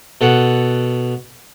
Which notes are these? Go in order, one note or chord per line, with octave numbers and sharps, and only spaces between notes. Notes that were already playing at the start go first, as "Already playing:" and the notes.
B2 A4 F#5